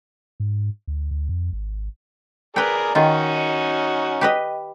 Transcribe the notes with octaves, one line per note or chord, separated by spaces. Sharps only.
G#2
D2
D2
F2
G#1
G#4 A#4 B4 D5 G5
D#3 C#4 D#4 F4 F#4
G4 B4 D#5